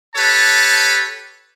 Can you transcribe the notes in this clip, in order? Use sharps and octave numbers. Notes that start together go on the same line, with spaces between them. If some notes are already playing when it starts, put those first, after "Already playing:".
G4 A4 B4 C#5 A5